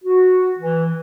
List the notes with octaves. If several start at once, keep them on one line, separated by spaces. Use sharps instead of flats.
F#4
E3